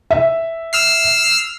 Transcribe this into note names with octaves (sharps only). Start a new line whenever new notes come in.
E5
E6 F6 C7